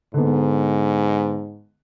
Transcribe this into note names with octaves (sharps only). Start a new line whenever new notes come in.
G#2 D3 B3